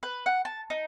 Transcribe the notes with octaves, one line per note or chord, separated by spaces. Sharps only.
B4
F#5
A5
D#4